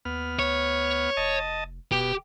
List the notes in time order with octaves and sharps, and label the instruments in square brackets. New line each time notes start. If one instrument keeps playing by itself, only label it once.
[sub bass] D#2 [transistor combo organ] B3 F6
[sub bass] D2 [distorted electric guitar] C#5
[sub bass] F1 [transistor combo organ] D#5 A5
[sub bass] D#1 [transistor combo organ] B2 [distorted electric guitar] G4